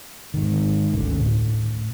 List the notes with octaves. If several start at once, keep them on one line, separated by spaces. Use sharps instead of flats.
G#2 D#3
G#1 D2 D3 C#4
A2